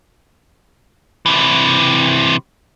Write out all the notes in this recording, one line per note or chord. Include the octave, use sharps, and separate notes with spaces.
C3 E3